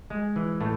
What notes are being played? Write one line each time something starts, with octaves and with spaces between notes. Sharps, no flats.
G#3
E3
A2 A3